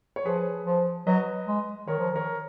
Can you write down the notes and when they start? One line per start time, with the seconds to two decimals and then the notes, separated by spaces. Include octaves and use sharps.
0.16 C#5
0.25 F3 G#4 B4
0.66 F3
1.07 F#3 B4 D#5
1.47 G#3
1.88 D#3 A#4 C#5
1.99 F3
2.12 D#3 A#4 C#5